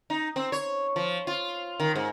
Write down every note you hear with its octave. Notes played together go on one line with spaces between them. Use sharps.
D#4
C4
C#5
F3
F4
D#3
G#2